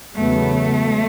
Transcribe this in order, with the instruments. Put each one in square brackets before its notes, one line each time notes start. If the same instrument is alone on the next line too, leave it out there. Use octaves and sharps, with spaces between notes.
[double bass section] E2 C#3 F#3 B3 [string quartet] A3